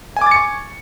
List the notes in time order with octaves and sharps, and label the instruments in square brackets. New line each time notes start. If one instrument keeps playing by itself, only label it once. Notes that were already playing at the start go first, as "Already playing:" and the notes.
[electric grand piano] G#5
D6
A6
C#7
C#6